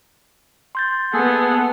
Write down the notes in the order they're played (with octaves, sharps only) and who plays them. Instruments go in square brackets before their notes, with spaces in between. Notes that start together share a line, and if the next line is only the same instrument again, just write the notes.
[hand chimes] C6 G6 A6
[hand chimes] A#3 [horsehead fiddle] B3 F#5 [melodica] G#4 A4